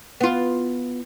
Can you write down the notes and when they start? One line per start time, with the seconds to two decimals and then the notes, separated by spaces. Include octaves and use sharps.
0.21 B3 F4